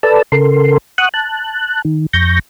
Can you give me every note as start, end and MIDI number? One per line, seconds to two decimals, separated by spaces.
0.03 0.22 69
0.03 0.22 71
0.03 0.22 74
0.03 0.22 81
0.03 0.22 88
0.32 0.78 49
0.32 0.78 69
0.32 0.78 70
0.32 0.78 84
0.98 1.09 78
0.98 1.09 85
0.98 1.09 87
0.98 1.09 90
1.14 1.82 81
1.14 1.82 90
1.85 2.06 51
2.13 2.39 41
2.13 2.39 85
2.13 2.39 91
2.13 2.39 94